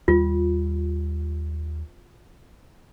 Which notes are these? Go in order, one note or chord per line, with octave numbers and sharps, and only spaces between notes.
D#2 G3 F4